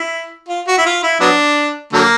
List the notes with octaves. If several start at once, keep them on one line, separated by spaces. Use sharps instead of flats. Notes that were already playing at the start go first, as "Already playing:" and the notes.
Already playing: E4
F4
F#4
E4
F4
E4
F#3 B3 D4
D3 F#3 A#3